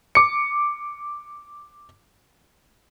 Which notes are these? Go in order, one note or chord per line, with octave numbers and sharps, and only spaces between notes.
D6 C#7